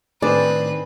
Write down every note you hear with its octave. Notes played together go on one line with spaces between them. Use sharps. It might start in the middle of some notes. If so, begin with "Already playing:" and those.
A2 D#3 C4 D4 G#4 B4 D5